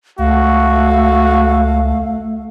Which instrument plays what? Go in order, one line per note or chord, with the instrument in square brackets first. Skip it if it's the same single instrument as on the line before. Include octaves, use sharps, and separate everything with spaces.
[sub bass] C#2 [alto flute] A3 [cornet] F#4 [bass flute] F5